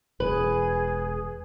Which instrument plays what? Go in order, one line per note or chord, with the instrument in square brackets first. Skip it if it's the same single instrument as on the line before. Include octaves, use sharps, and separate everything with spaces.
[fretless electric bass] E1 [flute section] G#4 [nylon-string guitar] B4